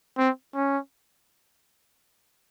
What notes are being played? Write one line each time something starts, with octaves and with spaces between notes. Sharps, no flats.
C4
C#4